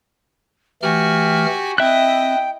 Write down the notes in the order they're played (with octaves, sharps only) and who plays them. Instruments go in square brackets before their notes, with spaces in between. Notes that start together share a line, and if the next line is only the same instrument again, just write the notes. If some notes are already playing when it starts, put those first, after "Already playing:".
[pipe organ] E3 A3 F6 [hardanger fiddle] F#4 G#5 [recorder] G4
[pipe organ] C4 [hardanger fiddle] E4 D#5 [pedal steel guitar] E5 F#6 [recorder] G5